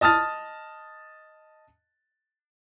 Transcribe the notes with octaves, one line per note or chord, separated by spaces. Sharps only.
D#5 A5 D#6 F6 A6